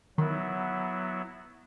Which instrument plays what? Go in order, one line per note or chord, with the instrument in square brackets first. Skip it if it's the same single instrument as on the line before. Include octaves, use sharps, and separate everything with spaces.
[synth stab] D#3 [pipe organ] F#3 B3 E4